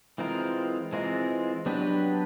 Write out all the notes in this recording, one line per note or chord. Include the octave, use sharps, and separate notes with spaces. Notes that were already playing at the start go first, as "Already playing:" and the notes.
E3 G#3 C4 F4 A#4
E3 G#3 C4 F4 A#4
F#3 B3 D4 G4 B4